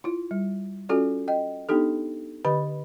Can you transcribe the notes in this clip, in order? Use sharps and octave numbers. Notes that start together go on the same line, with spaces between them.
E4 F4
G3
C#4 F4 F#4 A4 D5
D#5 G5
B3 D4 D#4 G4 A4
D3 G4 B4 D#5 B5